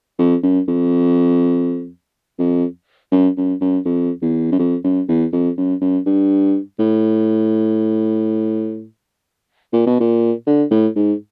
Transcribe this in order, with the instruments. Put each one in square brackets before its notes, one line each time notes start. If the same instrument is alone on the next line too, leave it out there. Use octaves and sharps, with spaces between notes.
[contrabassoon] F2
F#2
F2
F2
F#2
F#2
F#2
F2
E2
F#2
F2
F#2
E2
F2
F#2
F#2
G2
A2
A#2
B2
A#2
D3
A2
G#2